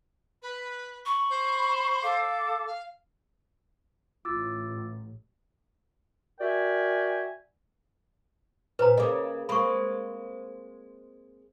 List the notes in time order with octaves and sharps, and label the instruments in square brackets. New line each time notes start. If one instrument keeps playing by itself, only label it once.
[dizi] B4
[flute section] B5 [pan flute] C#6
[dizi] C5
[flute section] A4 D6 [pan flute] F5
[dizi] F5
[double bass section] A1 [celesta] F4 [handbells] D6 E6 A6
[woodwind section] F#4 A#4 D5 E5 G5 G#5
[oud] A#2 [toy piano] B4 C5 A#5
[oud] C#3 A#3 [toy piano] D#5 D6
[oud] G#3 A#3 C4 [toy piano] B5 C#6